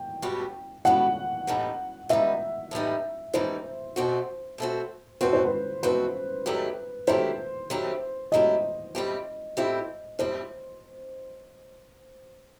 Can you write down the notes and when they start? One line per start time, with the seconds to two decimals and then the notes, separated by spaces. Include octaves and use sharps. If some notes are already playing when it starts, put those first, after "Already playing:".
Already playing: G5
0.22 A2 G3 B3 F#4
0.85 A2 G3 B3 F#4 F#5
1.47 A2 E3 G3 D#4
2.09 A2 E3 G3 D#4 E5
2.71 A2 E3 G3 D#4
3.34 A2 E3 G3 D#4 C5
3.96 B2 A3 C4 F#4
4.58 B2 A3 C4 F#4
5.21 B2 A3 C4 F#4 B4
5.33 C5
5.45 B4
5.83 B2 A3 C4 F#4 B4
6.46 D#3 F#3 A3 E4 G4
7.07 D#3 F#3 A3 E4 G4 C5
7.70 D#3 F#3 A3 E4 G4
8.32 D#3 F#3 A3 E4 G4 D#5
8.95 A2 G3 C4 E4 G4
9.57 A2 G3 C4 E4 G4
10.19 A2 G3 C4 E4 G4 C5